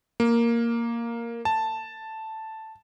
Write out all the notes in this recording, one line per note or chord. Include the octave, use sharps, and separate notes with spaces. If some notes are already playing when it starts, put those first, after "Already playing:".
A#3
A5